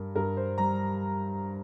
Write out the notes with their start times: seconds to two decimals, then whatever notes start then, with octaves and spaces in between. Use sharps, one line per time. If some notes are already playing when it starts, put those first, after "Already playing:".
Already playing: G2 G3 A#4
0.15 G2 A#4
0.37 C5
0.58 G3 A#5